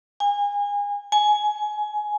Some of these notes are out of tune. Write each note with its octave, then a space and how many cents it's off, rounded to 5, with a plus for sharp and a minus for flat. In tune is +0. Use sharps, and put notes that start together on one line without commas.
G#5 -30
G#5 +10